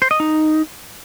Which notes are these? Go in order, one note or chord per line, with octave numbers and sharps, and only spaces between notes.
C5
D#5
D#4